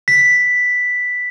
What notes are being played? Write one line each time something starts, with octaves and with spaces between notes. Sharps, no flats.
B6